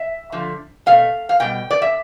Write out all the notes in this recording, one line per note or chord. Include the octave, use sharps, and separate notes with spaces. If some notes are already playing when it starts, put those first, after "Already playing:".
Already playing: E5
D3 F3 A3
B2 A3 F5
F5
B2 G3 G5
D5
E5